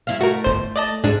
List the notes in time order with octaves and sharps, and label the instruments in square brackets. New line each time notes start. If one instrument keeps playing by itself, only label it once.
[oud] G2 E4 F5
[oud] A3 [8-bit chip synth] F#4 A#4
[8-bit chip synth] G1 C5
D5 D#5 A5
[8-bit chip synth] G#2 D4 [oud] G#4